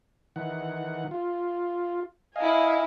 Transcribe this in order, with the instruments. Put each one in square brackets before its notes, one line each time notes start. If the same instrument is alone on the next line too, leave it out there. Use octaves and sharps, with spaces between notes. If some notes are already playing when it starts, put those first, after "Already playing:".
[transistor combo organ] D#3 E3 F#5
F4
[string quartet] E4 G#5 [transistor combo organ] D#5 F5